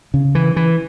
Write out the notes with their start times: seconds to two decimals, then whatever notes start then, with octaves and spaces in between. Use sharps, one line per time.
0.14 C#3
0.35 E3
0.56 E3